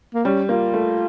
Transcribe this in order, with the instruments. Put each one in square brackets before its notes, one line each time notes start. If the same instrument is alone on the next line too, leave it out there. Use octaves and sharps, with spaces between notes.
[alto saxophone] A#3
[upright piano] G3 [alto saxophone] C#4
[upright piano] A#3 [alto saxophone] F4
[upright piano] A3